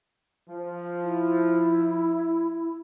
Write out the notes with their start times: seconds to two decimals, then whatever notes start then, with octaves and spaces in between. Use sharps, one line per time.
0.49 F3
1.02 E4